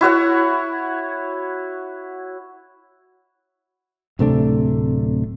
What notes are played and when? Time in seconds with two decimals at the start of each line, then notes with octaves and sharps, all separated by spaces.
0.01 E4 F#4 C#5 F#5
4.19 D1 C3 A3 D4